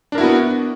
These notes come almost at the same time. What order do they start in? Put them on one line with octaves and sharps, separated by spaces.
D4 A#4 E4 F#4 B3